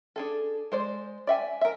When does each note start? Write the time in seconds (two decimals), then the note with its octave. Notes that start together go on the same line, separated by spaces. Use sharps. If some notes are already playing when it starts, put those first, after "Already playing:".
0.16 D4 G#4 A4
0.72 G#3 C5 D5
1.27 D5 E5 G5 G#5
1.61 A#4 E5